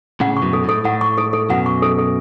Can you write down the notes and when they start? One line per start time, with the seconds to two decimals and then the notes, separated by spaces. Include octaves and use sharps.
0.20 A2 C#3 F#5
0.37 C#6
0.42 F#2 B2
0.53 A4
0.64 A2 A4
0.85 A2 F#5
1.01 C#6
1.18 A4
1.33 A4
1.50 F#2 B2 F#5
1.66 C#6
1.82 A4
1.98 A4